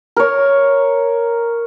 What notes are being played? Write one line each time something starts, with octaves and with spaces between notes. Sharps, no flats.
A#4 C#5